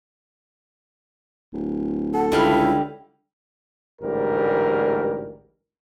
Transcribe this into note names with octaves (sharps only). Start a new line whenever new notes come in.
D1
A4 F#5
C#2 D3 G3 E4 F5
A1 D2 G#2 G3 A#4